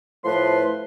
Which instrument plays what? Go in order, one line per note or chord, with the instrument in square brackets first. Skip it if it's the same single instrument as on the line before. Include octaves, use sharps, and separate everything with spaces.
[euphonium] A2 [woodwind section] F3 B4 C6